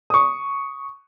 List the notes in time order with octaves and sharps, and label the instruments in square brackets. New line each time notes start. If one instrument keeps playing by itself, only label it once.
[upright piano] C#6 D#6